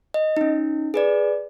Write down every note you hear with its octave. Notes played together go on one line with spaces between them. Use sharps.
D#5
C#4 D#4
G#4 B4 D5